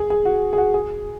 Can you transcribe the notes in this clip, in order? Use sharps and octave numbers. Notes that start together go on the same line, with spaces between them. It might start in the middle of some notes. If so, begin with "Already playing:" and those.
Already playing: G#4
G#4
F#4
G#4
F#4
G#4